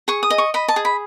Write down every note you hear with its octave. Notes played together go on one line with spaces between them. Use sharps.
G#4 C#6
D#6
D#5
C#6
D#5 B5
A5
G#4
B5